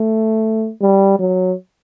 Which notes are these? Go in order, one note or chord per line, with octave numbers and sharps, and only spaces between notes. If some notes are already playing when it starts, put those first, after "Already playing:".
Already playing: A3
G3
F#3